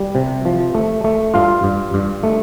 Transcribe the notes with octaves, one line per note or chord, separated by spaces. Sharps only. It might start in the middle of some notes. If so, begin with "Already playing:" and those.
Already playing: G3
C3
F3
A3
A3
G2 F4 F5
G2
G2
A3